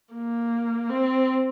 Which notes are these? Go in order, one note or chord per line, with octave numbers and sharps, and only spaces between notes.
A#3
C4